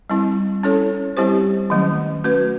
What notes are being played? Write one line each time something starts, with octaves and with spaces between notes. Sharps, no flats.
G3 C4 E4
C#4 E4 A4 C#5
G3 C4 E4 G4 C5
D#3 F#3 A3 C#4
A3 C#4 F#4 B4